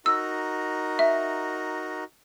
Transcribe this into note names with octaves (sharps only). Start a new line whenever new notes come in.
D#4 F#4 A#4 E6
E5